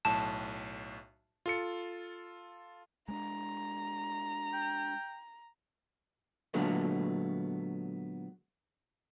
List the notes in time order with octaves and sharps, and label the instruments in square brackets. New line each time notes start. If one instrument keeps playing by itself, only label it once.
[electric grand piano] B1 A2 [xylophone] A5
[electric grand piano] F4 A4 C#7
[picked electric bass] G#3 A#3 D4 [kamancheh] A#5
[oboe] G5
[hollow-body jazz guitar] A#2 D3 F#3 G#3 A3 B3